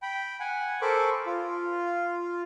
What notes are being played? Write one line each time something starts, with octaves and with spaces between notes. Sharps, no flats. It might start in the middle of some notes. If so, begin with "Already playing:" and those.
G5 B5
F#5 G#5
A4 A#4 C5 B5 C#6 D6
F4